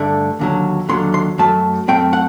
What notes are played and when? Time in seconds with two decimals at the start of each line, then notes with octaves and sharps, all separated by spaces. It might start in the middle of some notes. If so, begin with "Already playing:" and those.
Already playing: G2 D3 A3 D4
0.39 D#2 D3 F#3
0.89 D#2 D3 F#3 C6
1.14 C6
1.38 F#2 F#3 A3 A5
1.88 F#2 F#3 A3 C4 G5
2.13 F#5